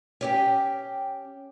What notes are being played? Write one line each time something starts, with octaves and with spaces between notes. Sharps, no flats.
C#4 G4 G5